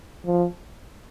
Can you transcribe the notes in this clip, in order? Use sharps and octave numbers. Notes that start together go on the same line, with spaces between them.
F3